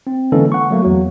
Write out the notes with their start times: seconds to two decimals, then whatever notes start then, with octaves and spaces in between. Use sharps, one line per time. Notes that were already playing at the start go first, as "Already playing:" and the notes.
0.07 C4
0.32 D3 E3 G#3 A#3 C#4 A4
0.52 F#5 C#6
0.70 F#3 A3 A#3
0.82 E2 F#3 F#4